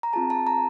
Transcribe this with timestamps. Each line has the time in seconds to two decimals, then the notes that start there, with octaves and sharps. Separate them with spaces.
0.03 A#5
0.13 C4 F4 G#4 A5
0.30 A5
0.47 A#5